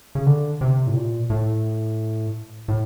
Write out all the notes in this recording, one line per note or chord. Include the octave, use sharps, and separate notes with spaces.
C#3
D3
C3
A2
A#2
A2
A2